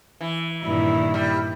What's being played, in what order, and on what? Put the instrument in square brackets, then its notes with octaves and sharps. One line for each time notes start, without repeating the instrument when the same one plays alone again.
[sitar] E3
[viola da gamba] G2 A#2 [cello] D#3 E4
[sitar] G3